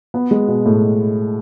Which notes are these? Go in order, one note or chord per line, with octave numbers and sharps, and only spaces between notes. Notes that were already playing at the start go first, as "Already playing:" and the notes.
B3
G#3
B2
A2